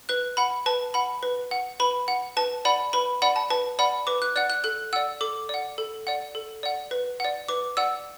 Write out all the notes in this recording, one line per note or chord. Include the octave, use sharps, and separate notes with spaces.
B4 F#6
F#5 B5
B4 A5
F#5 B5
B4
F#5
B4 B5
F#5
B4 A5
D5 F#5 B5
B4 B5
D5 F#5 B5
A5
B4 A5
D5 F#5 B5
B4 D6
F#6
D5 F#5 F#6
F#6
A4 F#6
D5 F#5 E6
A4 D6
D5 F#5
A4
D5 F#5
A4
D5 F#5
B4
D5 F#5
B4 D6
D5 F#5 E6